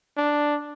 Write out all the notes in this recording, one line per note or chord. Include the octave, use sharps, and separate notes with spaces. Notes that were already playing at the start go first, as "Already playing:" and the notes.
D4